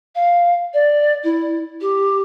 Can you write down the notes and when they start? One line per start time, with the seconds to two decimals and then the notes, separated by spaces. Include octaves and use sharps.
0.15 F5
0.73 D5
1.23 E4
1.81 G4